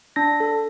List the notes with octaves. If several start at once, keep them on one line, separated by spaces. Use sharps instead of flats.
D4 A#6
A4